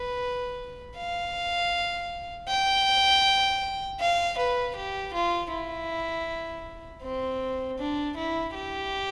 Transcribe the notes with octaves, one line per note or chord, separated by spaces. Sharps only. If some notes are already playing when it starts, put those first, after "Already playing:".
Already playing: B4
F5
G5
F5
B4
G4
F4
E4
C4
D4
E4
G4